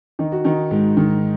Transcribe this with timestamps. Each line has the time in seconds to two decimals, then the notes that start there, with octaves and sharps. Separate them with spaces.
0.19 D#3 D#4
0.32 F#4
0.44 D#3 D#4
0.71 G#2
0.97 D#3